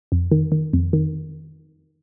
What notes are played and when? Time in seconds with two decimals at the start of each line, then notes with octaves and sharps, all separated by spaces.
0.12 F2
0.32 D#3
0.52 D#3
0.73 F2
0.93 D#3